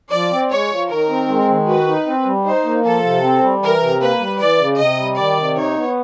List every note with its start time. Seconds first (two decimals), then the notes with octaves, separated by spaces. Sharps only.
0.12 F3 D5
0.32 C4
0.51 G#3 C#5
0.71 F3
0.90 D#3 A#4
1.09 C4
1.28 G#3
1.48 D#3
1.67 F#4 B4
1.88 D#4
2.07 C4
2.25 G3
2.45 D#4 C5
2.65 A#3
2.84 F3 A4
3.04 C3
3.23 C4
3.43 G3
3.62 E3 A#4
3.81 C3
4.01 A#3 B4
4.20 G3
4.39 E3 D5
4.60 C#3
4.78 C3 D#5
4.98 G3
5.17 D#3 D5
5.36 C3
5.56 D#4 C#5
5.76 B3